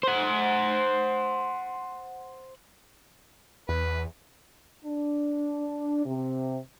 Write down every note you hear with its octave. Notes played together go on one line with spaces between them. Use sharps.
C5 F#5
E2 B4
D4
C3